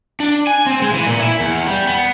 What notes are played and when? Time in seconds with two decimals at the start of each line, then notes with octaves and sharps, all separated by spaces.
0.20 D4
0.47 G#5
0.67 C4
0.82 G#3
0.94 E3
1.07 A#2
1.20 E4
1.40 E2
1.67 G3
1.87 B3